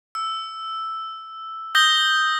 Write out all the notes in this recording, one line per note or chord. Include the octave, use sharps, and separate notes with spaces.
E6
D#6 G6 A#6 G7